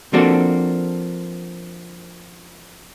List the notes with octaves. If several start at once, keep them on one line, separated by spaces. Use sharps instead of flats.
F3 A#3 C4 D4 F#4 A4